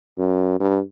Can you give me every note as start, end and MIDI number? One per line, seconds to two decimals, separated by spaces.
0.18 0.55 42
0.60 0.81 43